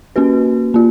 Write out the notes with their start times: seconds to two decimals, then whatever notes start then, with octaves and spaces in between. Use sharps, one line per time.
0.16 A#3 C#4 F#4 B4
0.74 A#3 F4